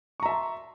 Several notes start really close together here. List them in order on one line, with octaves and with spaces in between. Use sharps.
C#6 A#5 E5 A5 C6